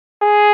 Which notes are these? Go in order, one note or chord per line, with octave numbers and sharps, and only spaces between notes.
G#4